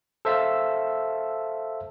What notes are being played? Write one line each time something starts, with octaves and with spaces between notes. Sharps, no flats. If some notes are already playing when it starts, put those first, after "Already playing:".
A4 C5 E5 F5 A5